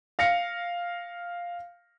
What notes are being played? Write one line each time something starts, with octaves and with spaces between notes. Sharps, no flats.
F5 A#6 C#7